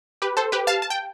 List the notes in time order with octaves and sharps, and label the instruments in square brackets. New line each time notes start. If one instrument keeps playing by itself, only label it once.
[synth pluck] G4 B4
A4 C5
G4 B4
F5 A5
A5
G5